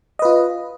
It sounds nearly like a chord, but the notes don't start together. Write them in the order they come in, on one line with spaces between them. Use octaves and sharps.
D#5 B4 F4